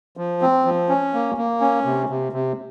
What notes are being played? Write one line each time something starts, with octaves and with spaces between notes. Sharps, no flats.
F3
C4
F3
C#4
A#3
A#3
C#4
C3
C3
C3